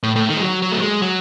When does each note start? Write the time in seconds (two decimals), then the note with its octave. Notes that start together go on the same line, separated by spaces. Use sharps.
0.03 A2
0.16 A2
0.29 D#3
0.37 G#3
0.42 F#3
0.62 F#3
0.72 A3
0.81 G#3
1.02 F#3